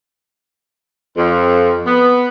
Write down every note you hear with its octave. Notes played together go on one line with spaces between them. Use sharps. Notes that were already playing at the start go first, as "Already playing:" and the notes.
F2
B3